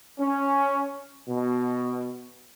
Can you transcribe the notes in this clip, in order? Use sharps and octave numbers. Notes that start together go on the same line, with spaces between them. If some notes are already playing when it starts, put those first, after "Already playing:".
C#4
B2